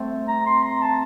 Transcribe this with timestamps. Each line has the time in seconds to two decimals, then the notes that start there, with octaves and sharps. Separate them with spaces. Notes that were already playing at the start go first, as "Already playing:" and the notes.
Already playing: A3 C4
0.28 A#5
0.46 C6
0.63 A#5
0.82 A5